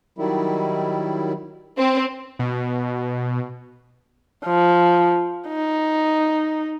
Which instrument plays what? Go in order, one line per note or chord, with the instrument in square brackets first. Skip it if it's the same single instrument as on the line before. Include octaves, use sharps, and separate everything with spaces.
[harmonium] D#3 F#3 G3 E4
[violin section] C4
[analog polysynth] B2
[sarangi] F3
D#4